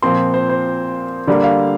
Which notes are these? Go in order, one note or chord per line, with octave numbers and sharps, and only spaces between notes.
A#2 F3 C4 C6
C5
C5
D3 G3 A#3 D5
F5